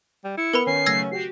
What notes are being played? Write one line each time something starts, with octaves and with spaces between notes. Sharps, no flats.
G3
E4 C#7
B3 A#4 B4 B5
D#3 C#4 C7
C#3 F#3 A3 E6 G#6 A#6
F#4 G4 C7